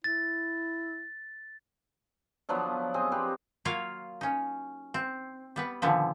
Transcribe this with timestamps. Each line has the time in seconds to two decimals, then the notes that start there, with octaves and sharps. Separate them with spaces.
0.04 E4 A6
2.49 D3 F3 F#3 B3
2.94 C4 G#4 D#5
3.12 C4 G4 B4
3.65 F#3 A#3 F4 A#4 C#5 F5
4.21 C#4 D#4
4.94 C4
5.56 G3 B3 B4
5.82 A#2 D3 D#3 F3 B3